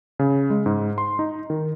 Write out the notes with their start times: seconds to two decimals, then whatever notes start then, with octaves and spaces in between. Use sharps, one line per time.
0.19 C#3
0.50 G#3
0.66 G#2
0.98 C6
1.19 D#4
1.50 D#3